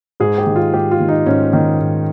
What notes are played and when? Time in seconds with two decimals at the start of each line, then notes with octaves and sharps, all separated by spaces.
0.20 G#2 G#4
0.38 G4
0.46 D#3
0.56 F4
0.73 G#2 G4
0.91 F4
1.00 D#3
1.09 D#4
1.26 G#2 C#4
1.53 D#3
1.80 G#2